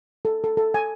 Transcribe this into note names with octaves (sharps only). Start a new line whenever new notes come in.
A4
A4
A4
G#5